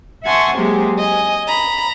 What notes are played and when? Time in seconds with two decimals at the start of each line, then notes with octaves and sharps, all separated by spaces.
0.25 E5 F#5 G#5 A5 C6 C#6
0.55 C3 F#3 G#3 A#3 G4 G#4
0.98 D#5 G#5
1.48 A#5 B5